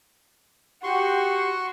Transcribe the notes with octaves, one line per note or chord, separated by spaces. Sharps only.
F#4 G4 C6 C#6